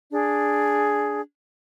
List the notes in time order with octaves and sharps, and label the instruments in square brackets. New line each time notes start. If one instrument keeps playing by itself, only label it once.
[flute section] D4 G#4